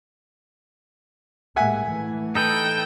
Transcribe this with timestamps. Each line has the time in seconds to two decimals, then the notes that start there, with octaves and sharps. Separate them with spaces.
1.56 A2 G#3 A#3 E5 F#5 G#5
1.86 E3 A3
2.35 D#4 A4 B4 G5